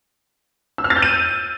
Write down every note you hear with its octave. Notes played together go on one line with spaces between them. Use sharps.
E6
F6
A6
G6
D#7